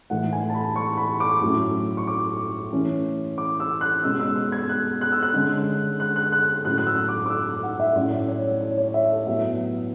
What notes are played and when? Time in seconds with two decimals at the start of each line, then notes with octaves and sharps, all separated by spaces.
0.10 A2 E3 A3 F#5
0.33 G#5
0.50 A5
0.54 B5
0.76 C#6
0.97 B5
1.20 D6
1.42 A2 F#3 A3 C#4
1.97 C#6
2.07 D6
2.73 E3 A3 C#4
3.38 D6
3.60 E6
3.81 F#6
4.03 B2 G#3 C#4 E6
4.20 E6
4.36 E6
4.52 G#6
4.69 F#6
5.01 F#6
5.12 E6
5.22 F#6
5.34 D3 G#3 C#4
6.00 F#6
6.16 F#6
6.32 F#6
6.65 A2 F#3 C#4 F#6
6.78 F#6
6.87 E6
7.09 D6
7.26 D6
7.30 E6
7.63 F#5
7.80 E5
7.96 A2 F#3 A3 C#4 D5
8.28 C#5
8.61 C#5
8.78 C#5
8.94 E5
9.10 A4
9.27 A2 F#3 B3 E5